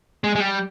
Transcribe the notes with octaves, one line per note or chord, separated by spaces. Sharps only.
G#3
G#3
G3